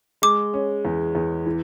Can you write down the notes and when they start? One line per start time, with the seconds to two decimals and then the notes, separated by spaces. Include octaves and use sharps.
0.22 G#3 D6
0.54 C#4
0.85 E2
1.15 E2
1.46 E3